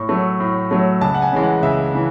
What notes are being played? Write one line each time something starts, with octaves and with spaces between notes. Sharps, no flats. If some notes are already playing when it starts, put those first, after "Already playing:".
Already playing: A2 C#6
F#3 A3
A2
F#3 A3
C#2 A5
F#5
G#5
C#3 E3 G#3
F#5
C#2 E5
C#3 E3